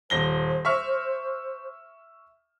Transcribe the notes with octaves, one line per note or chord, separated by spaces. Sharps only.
D#1 C5 A#6 G7
E5 C#6 F6